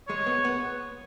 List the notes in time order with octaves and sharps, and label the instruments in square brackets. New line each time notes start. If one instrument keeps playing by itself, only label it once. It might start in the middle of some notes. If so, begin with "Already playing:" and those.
[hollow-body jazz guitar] G#3 [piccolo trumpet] C#5
[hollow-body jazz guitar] B3
B3